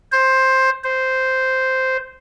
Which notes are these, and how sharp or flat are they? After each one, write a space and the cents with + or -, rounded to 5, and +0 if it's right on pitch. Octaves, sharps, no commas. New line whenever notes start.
C5 +10
C5 -5